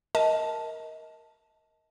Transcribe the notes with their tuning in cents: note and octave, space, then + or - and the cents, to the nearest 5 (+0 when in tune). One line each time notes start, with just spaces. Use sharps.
A#4 +0 D#5 +25 A5 +0